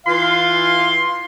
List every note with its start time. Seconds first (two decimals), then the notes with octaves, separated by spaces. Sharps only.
0.06 E3 F4 F5 C6